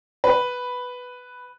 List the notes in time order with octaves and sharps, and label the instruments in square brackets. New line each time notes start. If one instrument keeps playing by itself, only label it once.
[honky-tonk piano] B4